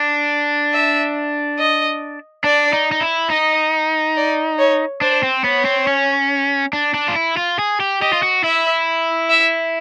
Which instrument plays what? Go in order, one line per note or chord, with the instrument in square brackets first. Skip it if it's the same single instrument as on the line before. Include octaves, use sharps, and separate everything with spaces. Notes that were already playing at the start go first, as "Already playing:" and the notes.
Already playing: [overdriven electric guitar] D4
[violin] E5
D#5
[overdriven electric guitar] D4 [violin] D5
[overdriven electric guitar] D#4
D#4
E4
[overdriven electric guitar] D#4 [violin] D#5
[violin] D5
C#5
[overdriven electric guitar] D4 [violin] C5
[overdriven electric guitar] C4
[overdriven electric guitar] B3 [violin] C#5
[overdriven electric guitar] C4
C#4
D4
D4
F4
E4
F4
G#4
G4
[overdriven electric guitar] G4 [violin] D#5
[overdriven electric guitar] F4
F#4
[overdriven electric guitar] E4 [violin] E5
[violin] E5